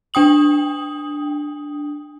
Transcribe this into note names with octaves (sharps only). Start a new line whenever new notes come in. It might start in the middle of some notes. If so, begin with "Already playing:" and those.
D4 G5 D#6 F#7